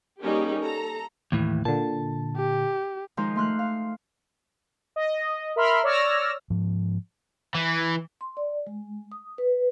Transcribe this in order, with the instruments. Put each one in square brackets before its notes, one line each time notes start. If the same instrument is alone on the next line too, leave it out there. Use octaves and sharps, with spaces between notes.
[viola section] G3 A#3 C#4 D#4 G4 G#4
A4 A#5
[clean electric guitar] D#2 A2 E3
[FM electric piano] A#2 D3 [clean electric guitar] A5
[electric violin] G4
[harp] D#3 F3 G#3 D#4 C5
A3 C6 F6 F#6
F5
[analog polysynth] D#5
A#4 E5 B5 C6 F6
C#5 D5 E6 F6 A#6
[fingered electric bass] G#2 F3
[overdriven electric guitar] E3
[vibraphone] C6
D5
G#3
D#6
B4